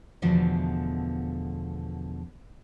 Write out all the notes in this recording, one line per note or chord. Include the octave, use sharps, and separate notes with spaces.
E2 B2 D3 F3 A3